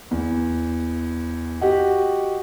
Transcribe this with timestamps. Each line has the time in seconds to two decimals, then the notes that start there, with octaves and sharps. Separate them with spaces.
0.11 E2
1.61 F#4 G4 D#5 F#5